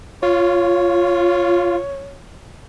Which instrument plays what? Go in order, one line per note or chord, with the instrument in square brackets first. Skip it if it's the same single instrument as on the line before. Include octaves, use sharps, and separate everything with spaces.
[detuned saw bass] F4 [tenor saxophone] C#5